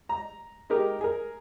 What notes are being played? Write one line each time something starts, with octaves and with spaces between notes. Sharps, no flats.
A#5
G#3 D#4 G4 A#4
G#4 A#4